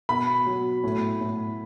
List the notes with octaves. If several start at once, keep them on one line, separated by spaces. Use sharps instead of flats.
B2 B5
F#3
A2
A2